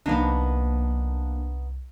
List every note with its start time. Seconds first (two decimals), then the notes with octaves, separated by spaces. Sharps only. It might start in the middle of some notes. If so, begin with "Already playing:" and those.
0.06 C2 F3 A#3 B3 D4 D#4